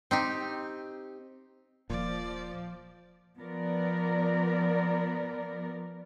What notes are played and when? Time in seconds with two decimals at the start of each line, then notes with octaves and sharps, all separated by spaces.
0.11 C4 D#4 G4
1.90 D#1 A#2 F3 D5
3.38 F3 B3 A#4 D5